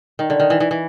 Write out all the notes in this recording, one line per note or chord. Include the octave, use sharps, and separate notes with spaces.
D#3
D3
D#3
E3
E3
E3